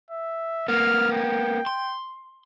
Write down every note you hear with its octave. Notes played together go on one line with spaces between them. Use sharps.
E5
A#3 B3 F6
G5
C6